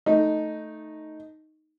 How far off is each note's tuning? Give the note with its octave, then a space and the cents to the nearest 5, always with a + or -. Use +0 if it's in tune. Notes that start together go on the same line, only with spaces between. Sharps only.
A3 +0 D#4 +0